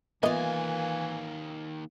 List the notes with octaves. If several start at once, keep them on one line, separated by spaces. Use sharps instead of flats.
D#2 E3 A#3 B3 F4 D#5 E5 G#5